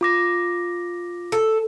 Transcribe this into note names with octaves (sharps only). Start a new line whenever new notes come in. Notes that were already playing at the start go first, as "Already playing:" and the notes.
F4 D6 A#6
A4